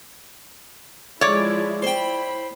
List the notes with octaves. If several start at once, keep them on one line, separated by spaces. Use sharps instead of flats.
F3 G#3 E4 C#5 D5
E4 C5 G5 B5